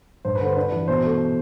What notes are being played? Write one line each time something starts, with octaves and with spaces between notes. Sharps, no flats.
G2 C5
B4
D3 C5
D4 B4
E3
B2 C5
A3